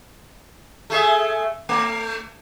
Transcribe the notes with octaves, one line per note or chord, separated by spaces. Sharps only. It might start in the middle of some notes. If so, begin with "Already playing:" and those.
A3 G#4 E5
A3